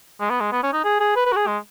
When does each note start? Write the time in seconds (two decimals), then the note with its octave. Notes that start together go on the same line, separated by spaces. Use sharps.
0.20 G#3
0.30 B3
0.41 G#3
0.52 B3
0.63 C#4
0.73 D#4
0.84 G#4
1.00 G#4
1.16 B4
1.26 B4
1.32 F#4
1.36 G#4
1.47 G#3